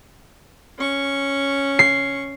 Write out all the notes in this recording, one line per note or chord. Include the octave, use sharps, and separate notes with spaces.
C#4 C#6
C7